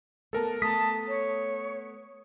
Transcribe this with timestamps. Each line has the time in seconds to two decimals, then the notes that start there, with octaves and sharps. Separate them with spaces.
0.33 A3 B3 A4 A#4 A5
0.62 A3 B3 A5 A#5 D#6 B6
1.08 C#5